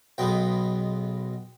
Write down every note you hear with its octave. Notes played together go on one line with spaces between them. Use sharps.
B1 B2 G#3 B3 G5